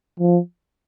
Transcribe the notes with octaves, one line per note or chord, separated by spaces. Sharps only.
F3